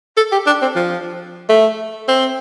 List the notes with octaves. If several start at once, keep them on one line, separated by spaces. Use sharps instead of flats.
A4
G4
D4
C4
F3
A3
C4